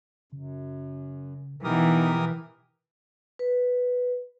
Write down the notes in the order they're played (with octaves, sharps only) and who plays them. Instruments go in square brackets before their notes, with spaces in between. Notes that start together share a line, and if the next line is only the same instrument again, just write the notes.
[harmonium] F#2 [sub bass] C#3
[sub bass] B2 [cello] E3 [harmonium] B3 D#4 [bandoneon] G4 A#4 D#6
[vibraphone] B4